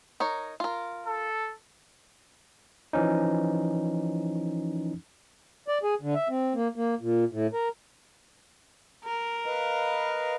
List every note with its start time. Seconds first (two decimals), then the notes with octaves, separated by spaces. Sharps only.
0.20 D#4 A#4 C#5
0.60 F4 A#4
1.07 A4
2.93 E3 F3 C#4 D#4
5.68 D5
5.83 G#4
6.01 D3
6.15 E5
6.29 C4
6.55 A#3
6.76 A#3
7.01 A#2
7.32 A2
7.53 A#4
9.04 A#4
9.46 B4 D#5 F5